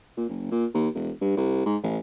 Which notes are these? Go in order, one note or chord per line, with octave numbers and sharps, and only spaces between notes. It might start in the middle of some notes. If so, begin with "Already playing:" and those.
A#2
F#1
A#2
D#2
E1
G2
C2
G#2
A1